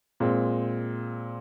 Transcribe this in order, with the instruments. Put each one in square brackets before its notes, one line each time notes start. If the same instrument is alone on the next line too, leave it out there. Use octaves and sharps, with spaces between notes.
[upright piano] A#2 G#3 C4